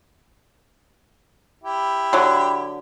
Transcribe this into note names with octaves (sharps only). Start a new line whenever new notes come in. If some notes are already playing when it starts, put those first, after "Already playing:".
E4 G4
D3 F#3